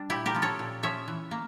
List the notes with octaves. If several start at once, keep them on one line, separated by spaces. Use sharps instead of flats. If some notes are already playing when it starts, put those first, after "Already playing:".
Already playing: G3 D4
A#2 E4 G4
G4 A#4
F3 C#4
A4 C#5
A#2
F3 C#4 C#5 E5
E3
A#3